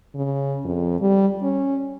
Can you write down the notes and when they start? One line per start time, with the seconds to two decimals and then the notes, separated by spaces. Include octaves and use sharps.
0.15 C#3
0.65 F2
1.01 G3
1.43 C#4